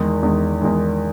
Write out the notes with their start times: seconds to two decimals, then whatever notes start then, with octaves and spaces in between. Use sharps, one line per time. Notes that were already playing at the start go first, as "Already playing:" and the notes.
Already playing: E2 D#3 G#3
0.23 E2 D#3 G#3
0.61 E2 D#3 G#3